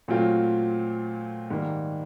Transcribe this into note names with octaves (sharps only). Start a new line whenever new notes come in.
A#2 F#3 A3 C4 F4
G#2 D#3 G3 A#3